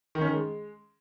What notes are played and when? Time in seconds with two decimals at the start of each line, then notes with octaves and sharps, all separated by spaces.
0.15 D#3
0.21 C#4
0.27 D#3
0.34 G#3